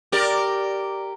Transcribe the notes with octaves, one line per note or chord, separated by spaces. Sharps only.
G4 A#4 D5